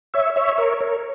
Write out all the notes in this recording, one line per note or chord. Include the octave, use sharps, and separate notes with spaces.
C#5 E5
C#5 E5
A#4 C#5
A#4 C#5